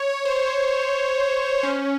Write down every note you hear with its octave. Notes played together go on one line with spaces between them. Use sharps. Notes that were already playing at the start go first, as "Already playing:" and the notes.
Already playing: C#5
C5
C#4